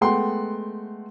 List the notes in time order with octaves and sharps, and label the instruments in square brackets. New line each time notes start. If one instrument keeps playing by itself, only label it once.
[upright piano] G#3 A3 B3 F#5 G5 C6